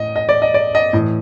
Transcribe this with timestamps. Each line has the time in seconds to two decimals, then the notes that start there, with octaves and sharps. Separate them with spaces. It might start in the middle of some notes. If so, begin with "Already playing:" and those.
Already playing: A2 D#5
0.16 D#5
0.29 D5
0.42 D#5
0.54 D5
0.75 D#5
0.93 A2 E3